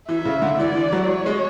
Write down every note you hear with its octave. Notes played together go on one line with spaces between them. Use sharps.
E3 E5
C#3
D3
E3 D5
E3
F#3
C#5
G#3